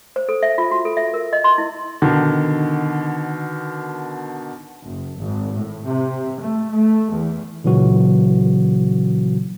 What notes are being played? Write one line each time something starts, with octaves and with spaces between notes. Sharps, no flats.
C5
A4
E5
F4
F#4
A4
E5
A#4
D#5
C6
E4
B2 D3 D#3
F#1
G#1
A2
C3
A3
A3
E2
A#2 C#3 E3 F#3 F#4